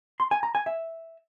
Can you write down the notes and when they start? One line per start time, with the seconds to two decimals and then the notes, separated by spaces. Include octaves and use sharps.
0.20 C6
0.31 G#5
0.43 A#5
0.55 G#5
0.66 E5